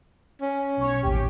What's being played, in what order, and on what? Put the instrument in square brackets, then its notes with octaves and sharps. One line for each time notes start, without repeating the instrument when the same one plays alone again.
[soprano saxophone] C#4
[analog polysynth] B1 C#5
A1 D#2 G4